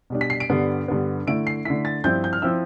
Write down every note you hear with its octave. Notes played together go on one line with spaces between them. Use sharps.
B2 G3 D4
B6
C7
D7
G2 D3 G3 B3
G2 D3 G3 B3
D3 A3 E4 D7
C7
D3 A3 E4 B6
A6
G2 F3 C4 E4 G6
G6
F6
F3 C4 E4 E6